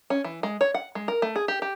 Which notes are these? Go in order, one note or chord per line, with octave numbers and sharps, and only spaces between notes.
C#4
E3
G#3
C#5
F#5
G#3
A#4
A3
G#4
G4
G4